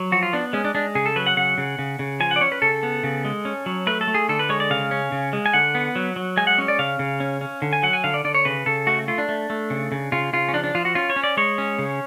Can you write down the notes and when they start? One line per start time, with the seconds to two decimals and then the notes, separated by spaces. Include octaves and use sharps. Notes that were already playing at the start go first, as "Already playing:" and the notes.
Already playing: F#3
0.12 F3 F#4
0.23 F4
0.33 B3 D4
0.53 G#3 C#4
0.65 D4
0.75 G#3 D4
0.95 C#3 G#4
1.06 A4
1.16 F#3 B4
1.26 F#5
1.37 C#3 F#5
1.58 C#3
1.79 C#3
1.99 C#3
2.20 F3 G#5
2.31 D5 F#5
2.41 C#4 C#5
2.52 B4
2.62 C#3 A4
2.83 B3
3.04 C#3
3.25 G#3
3.45 C#4
3.66 F#3
3.87 A3 B4
4.01 A4
4.07 A3
4.15 G#4
4.29 D3 A4
4.39 B4
4.49 G#3 C#5
4.60 D5
4.70 C#3 F5
4.91 C#4
5.12 C#3
5.33 G#3
5.46 G#5
5.53 D3 F#5
5.75 B3
5.96 F#3
6.16 F#3
6.37 G#3 G#5
6.47 F#5
6.58 C#4
6.68 D5
6.79 C#3 F5
6.99 C#3
7.20 C#4
7.41 C#4
7.62 D3
7.73 G#5
7.83 F#3 F#5
7.93 G#5
8.04 D3 F5
8.14 D5
8.24 D3 D5
8.35 C#5
8.45 C#3 B4
8.66 C#3 A4
8.87 A3 F#4
9.08 A3 F4
9.18 D4
9.29 A3
9.50 A3
9.70 C#3
9.92 C#3
10.12 C#3 F4
10.33 C#3 F4
10.49 C#4
10.53 F3 D4
10.64 D4
10.75 F3 F4
10.85 F#4
10.95 C#4 F4
11.10 C#5
11.16 C#4
11.24 D5
11.37 G#3 C#5
11.58 C#4
11.79 C#3